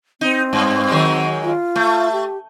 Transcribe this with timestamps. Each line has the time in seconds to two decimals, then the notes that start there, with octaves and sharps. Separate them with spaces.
0.21 C4 D#4
0.53 G2
0.90 D#3 F#3 G#3
1.44 F4
1.76 A3
2.12 G4